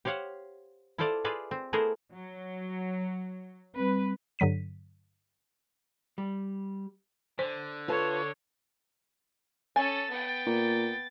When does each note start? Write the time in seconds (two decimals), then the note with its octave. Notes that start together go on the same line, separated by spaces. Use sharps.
0.05 G4 C5 C#5 F5 F#5
0.98 E4 F4 A4 C5 D5 F5
1.24 F4 G#4 B4 D5 E5
1.51 C4
1.73 A3 B3 E4 G#4 A#4 C5
2.11 F#3
3.76 G3 C4 B4
4.39 G2 D3 F#3 B6 D#7
6.18 G3
7.39 D3 C5
7.88 F4 A4 B4 C#5 A5
9.76 C#4 A4 G#5 A6
10.10 B3 G5
10.46 A#2